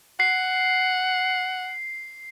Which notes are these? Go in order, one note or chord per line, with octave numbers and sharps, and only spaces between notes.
F#5 C7